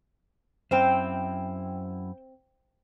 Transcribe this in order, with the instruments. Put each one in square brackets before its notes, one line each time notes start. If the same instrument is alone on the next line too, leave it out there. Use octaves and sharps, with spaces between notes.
[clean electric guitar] F#2 E4 [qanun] C4 F5 [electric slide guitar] C5 G5